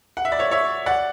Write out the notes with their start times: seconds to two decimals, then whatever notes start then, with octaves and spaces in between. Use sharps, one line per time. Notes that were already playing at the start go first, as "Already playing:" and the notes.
0.17 F#5
0.25 E5
0.32 D5
0.39 C#5 E5
0.51 C#5 E5
0.86 D5 F#5